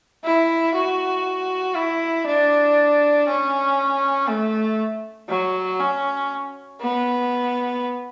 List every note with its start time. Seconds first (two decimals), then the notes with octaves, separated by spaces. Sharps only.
0.24 E4
0.74 F#4
1.75 E4
2.26 D4
3.27 C#4
4.28 A3
5.29 F#3
5.80 C#4
6.81 B3